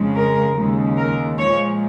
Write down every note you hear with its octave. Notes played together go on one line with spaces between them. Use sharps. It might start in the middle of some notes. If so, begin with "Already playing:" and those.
Already playing: F2 C#3 G#3
A#4
D#2 C#3 G#3
A#4
A#2 F3 G#3 C#5